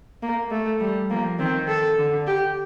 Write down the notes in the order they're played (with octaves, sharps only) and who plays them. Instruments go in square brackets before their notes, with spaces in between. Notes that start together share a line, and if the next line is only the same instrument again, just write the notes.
[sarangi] A#3
A3
[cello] G3
[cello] F3 [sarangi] A#3
[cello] D#3 [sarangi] C4
[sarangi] A4
[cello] D3
[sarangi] G4